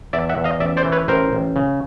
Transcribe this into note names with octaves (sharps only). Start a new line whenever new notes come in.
E2 D5 E5
E5 F#5
E2
D#5 F5
A1 D5 E5
C5 D5
E3
B4 C#5
A1 A#4 C5
A1
C#3